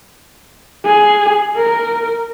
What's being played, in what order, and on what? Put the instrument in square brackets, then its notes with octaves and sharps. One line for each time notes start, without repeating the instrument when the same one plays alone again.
[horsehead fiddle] G#4
A#4